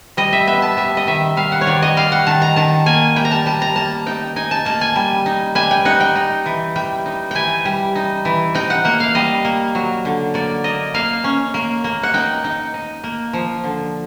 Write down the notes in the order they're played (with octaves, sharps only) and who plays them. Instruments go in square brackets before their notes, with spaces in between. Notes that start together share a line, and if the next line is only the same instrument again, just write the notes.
[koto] G3 D#5
E5
B3 E5
A5
G3 E5
D#5
D#3 E5
G3 F5
F#5
C#5
D#3 D5
D#5
G3 F5
F#5
D#3 A5
A#5
D#3 A5
A#3 G#5
G3 G5
A#5
A5
G3 A5
A#5
A#3 A5
D#4 G5
D#4 G#5
A5
A#3 A5
G#5
G3
D#4
G3 G#5
G5
D#4 F#5
G5
D#4
E3
G3 G5
D#4
E3 G5 G#5
G3
D#4
E3
D#4 G5
F#5
A#3 F#5
F5
G3 D#5
A#3
F#3
D3
A#3 D5
A#3 D#5
A#3 F5
C#4
A#3
A#3
F#5
D#4 G5
D#4
D#4
A#3
F3
D3